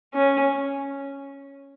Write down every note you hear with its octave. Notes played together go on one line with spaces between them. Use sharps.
C#4